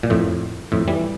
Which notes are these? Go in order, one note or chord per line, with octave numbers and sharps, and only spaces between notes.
A#2
F2 A2
F2 A2
E3 G3